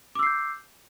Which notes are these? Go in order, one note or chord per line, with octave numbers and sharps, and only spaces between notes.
D6 E6 G6 C7